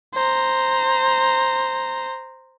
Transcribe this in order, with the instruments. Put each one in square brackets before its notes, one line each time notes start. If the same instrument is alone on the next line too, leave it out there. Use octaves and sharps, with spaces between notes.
[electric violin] C5 A#5